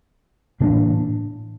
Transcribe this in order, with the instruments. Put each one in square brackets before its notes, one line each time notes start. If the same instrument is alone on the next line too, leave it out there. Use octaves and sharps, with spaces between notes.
[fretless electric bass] A2 E3 A#3 D4